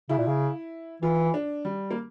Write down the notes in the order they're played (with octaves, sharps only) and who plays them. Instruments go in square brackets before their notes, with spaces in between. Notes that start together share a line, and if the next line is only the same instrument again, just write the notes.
[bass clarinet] C#3 [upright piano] E4
[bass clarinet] A#2
C#3
[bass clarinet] E3 [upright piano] F4
[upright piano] D4
G3
A#3